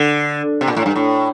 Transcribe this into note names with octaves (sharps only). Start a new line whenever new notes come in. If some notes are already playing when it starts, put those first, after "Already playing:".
Already playing: D3
C3
A#2
A2
G2
A2